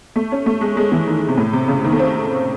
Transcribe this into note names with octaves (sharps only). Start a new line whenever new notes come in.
A3
C#4
A3
G#3
G#3
E3
D#3
C3
A2
C3
C#3
D#3
A3
C4